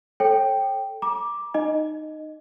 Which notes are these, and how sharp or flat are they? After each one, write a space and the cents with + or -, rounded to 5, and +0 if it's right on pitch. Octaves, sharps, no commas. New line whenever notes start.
A4 +0 C#5 -35 G5 +0
A#5 +40 D6 +0
D#4 -15 D#5 +0